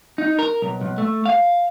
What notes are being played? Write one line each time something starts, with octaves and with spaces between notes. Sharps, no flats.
D#4
A#4
B1
B1
A3
F5